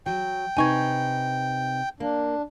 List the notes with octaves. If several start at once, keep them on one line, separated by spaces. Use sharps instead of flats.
F#3 G5
C3 D#4 B4 G#5 C#6 G#6
A#3 D4